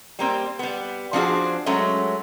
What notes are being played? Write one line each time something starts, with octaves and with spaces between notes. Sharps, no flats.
G3 A#3 C4
G3 B3
F3 C4 D4 F4 F#4 G#4
F#3 G#3 A3 C#4